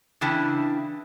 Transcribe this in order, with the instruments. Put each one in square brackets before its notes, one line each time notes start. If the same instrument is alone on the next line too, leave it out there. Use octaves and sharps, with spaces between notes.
[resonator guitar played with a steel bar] C#3 E3 D4 E4 G5